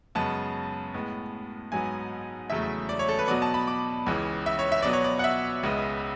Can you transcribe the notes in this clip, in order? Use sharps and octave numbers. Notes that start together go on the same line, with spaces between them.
F#2 C#3 G#3 B3 A5
A2 G#3 B3
G#2 F#3 B3 G#5
E2 C#3 F#3 A3 E5
D5
C#5
A4
B4
B2 F#3 B3 D5
A5
B5
D6
C#2 C#3 E3
E5
C#5
E5
B2 F#3 B3 D5
C#5
D5
F#5
E5
C#2 C#3 G#3 B3